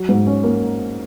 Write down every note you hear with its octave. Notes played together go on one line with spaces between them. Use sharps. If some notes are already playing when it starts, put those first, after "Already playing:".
Already playing: F#3
G#2
C#4
A#3